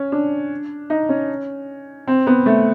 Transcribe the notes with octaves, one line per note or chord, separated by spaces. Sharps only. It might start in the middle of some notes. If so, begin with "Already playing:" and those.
Already playing: C#4
D4
D#4
C#4
C4
B3
A3